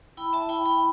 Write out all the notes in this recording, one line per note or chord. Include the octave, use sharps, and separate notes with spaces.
E4 G5 B5
E5 A5
E4 G5 B5
G5 B5